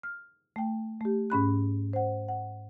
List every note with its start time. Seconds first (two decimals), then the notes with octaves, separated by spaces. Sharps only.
0.03 F6
0.56 A3 G5
1.01 A3 G4
1.30 G#2 C#4 B5 F#6
1.93 C5 F#5
2.28 F#5